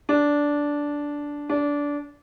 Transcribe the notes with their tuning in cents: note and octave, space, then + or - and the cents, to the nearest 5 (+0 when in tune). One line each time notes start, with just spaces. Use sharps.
D4 -10
D4 -20